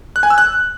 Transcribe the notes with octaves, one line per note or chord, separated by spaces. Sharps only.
F#6
G#5
E6
F#6